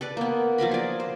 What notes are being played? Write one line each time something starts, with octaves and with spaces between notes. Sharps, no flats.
A4 B4 D5
A#3 B3
F3 F#3 A#4 B5
G#4 D5
C5